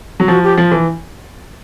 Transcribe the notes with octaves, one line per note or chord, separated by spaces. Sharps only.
F#3
F3 F#4
G4
F3
E3